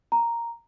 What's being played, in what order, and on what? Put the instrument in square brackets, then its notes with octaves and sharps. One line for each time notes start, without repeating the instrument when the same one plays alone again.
[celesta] A#5